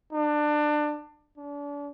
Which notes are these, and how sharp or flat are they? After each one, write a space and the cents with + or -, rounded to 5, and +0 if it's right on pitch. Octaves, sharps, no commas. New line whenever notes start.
D4 +25
D4 -35